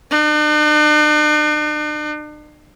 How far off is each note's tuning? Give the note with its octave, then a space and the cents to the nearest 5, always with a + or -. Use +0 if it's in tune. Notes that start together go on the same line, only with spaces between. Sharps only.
D4 +45